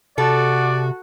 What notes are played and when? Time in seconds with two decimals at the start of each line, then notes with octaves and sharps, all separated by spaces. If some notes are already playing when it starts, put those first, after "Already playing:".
0.18 C3 F#4 A4 D5